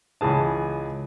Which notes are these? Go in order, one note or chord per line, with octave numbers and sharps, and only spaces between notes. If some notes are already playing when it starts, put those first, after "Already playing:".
C#2 E3 G#4 A5